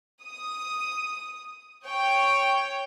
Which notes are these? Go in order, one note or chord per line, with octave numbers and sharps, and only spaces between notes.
D#6
C#5 G5